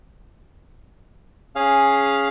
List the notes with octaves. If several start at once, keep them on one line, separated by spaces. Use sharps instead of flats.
C#4 G#4 F5